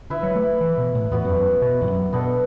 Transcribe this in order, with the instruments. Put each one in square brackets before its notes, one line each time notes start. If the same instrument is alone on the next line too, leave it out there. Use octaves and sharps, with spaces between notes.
[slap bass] D3 [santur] E4 B4 E5
[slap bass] F#3
A3
E3
B2
A2
[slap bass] E2 [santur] B3 F#4 D5
[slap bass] F#2
E2
F#2
B2
E2
F#2
[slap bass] B2 [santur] B3 D4 A4